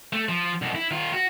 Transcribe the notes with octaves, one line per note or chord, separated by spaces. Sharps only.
A3
F3
C2 B2
E4
D#3 F4
F#4